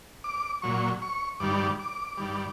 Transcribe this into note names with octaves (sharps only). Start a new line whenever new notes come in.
D6
A#2 F#3 C#6
C#6
G2 D#3 G3 D6
D6
G2 D#3 G3